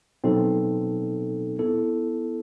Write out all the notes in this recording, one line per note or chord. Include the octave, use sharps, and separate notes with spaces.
B2 F#3 C4 D#4 A4
B3 E4 A4